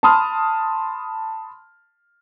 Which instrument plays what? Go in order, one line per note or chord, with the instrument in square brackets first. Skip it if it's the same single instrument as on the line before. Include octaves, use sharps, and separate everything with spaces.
[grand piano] A5 B5 C6 D#6 F6